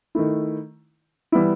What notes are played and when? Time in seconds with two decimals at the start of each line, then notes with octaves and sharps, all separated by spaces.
0.15 D#3 A3 E4
1.32 E3 G3 B3 E4